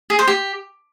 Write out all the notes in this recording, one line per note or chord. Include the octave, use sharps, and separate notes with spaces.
G#4
C5
G4